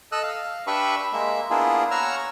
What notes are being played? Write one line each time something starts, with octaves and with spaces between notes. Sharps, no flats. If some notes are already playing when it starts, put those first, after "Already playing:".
A4 D#5 E6 F#6
F5
D4 G4 B4 E5 B5 C#6
G#3 A#3 E5
A#3 B3 D4 E4 F4 G#4
C#5 F#5 A#5 C#6 E6 F6